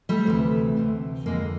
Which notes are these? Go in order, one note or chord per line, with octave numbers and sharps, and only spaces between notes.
G3 A3
D2 C3 E3
D2 C3 E3
F2 D3 G#3 A#3